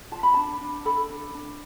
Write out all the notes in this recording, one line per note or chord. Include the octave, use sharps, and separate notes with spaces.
F4 A5
B5
D4 A5
D4
A4 B5
D4
D4